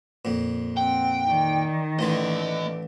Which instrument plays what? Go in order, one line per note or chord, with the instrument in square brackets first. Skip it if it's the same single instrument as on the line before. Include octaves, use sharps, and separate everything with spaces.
[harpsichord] F2 A#2
[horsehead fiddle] C4 F#5 [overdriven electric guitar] G5
[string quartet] D#3 [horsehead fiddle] D#4 D5
[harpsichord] A1 E3 C6 [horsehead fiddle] A3 D5 [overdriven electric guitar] A#3 D#5